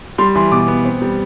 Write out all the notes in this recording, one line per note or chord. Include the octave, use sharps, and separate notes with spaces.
G3 C6
E3 C6
B2 D6
B3
C4
G3